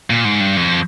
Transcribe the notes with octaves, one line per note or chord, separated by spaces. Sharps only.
A#2
G#2
G2
F2